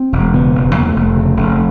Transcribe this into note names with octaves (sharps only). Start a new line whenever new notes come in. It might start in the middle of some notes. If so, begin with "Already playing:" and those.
Already playing: C4
E1
C#3 B3
E1
E2 A#3
A3
F1
A3
C#3
F1